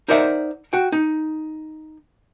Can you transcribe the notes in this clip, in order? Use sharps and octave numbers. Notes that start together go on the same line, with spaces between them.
D#4 A#4 C5 D5 E5 F#5
F#4 G5
D#4